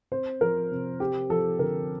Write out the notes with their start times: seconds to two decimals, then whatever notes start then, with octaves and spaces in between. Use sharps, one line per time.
0.12 C4 C5
0.41 F3 A#4
0.71 C3
1.00 C4 G4
1.30 F3 A4
1.59 D3 A#4